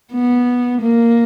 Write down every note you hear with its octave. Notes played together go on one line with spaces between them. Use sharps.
B3
A#3